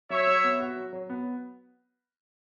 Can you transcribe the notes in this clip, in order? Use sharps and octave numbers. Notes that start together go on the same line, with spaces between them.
F#3 C#5 E5
F#3
B3
F#4
F#3
F#3
B3